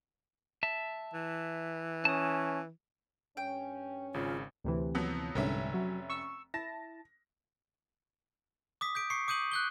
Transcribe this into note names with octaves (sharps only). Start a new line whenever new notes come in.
E5 A5
E3
C#4 A5 D#6
G2 C#4 G5
G#1 C#3 F4
D2 C3 E3
F3 F#3 B3
F1 C2 G#2 D3 C#4 E5
F#3
C#6 E6
E4 A5 A#6
D6 D#6 B6
G6 B6 D7
C#6 C7 C#7
D6 D#6 G6 D#7 F#7
F#6 G6 G7